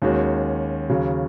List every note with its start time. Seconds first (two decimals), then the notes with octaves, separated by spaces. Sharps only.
0.02 D#2 D#3 G#3 C#4 F#4
0.90 D#2 C#3 F#3